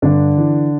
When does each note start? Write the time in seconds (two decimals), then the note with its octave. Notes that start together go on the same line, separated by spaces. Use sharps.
0.02 G2 D3 D4
0.37 E3